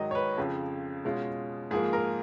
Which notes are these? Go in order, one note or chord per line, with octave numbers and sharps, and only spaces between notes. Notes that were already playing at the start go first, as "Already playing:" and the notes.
Already playing: G#2 D#3 F#3 D#5
C#5
B4
F2 C#3 F3
B2 G#3 C#4 F4
G#2 F3 A#3 G#4
A#4